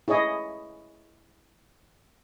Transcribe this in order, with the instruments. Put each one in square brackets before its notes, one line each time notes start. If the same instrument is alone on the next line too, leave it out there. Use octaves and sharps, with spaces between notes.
[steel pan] E4 G#4 C#5 D#5